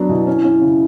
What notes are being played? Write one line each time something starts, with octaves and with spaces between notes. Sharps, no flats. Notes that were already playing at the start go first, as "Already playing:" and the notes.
Already playing: F#3 B3 D4
B2 E4
C#4 E4
C#4
C#3